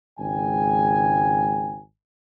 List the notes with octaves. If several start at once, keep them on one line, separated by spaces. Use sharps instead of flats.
G#1 C#2 G#4 G5 G#5